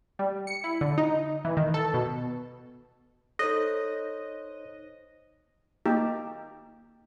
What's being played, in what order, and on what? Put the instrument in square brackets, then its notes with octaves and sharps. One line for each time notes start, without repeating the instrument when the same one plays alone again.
[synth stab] G3
C#7
E4
D3
D#4
E3
D#3
A4
B2
[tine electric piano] D#4 C5 F#6 [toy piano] A4 [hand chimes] C#5 [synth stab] D#5
[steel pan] A#3 D#4 G4